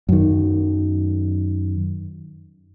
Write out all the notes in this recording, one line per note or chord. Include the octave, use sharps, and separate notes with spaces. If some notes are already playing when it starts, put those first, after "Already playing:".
F#2 D#3